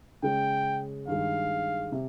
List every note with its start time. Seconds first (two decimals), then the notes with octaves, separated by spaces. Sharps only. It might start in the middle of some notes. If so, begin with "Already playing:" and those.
0.23 C#3 G#3 C#4 G5
1.07 G2 D#3 G#3 F5
1.92 C3